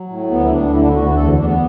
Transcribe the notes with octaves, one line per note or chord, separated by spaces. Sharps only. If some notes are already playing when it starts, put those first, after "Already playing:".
Already playing: F#3
A2
D2 B3
E4
D2 D4
D3 E4
D4
E4
D2 F#4
E2 A4
E2 D4
B3